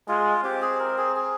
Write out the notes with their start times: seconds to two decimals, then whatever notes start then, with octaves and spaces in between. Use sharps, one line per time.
0.08 G#3 F4
0.44 C4 G4
0.62 G#4
0.80 A#4
0.98 G#4
1.16 G#4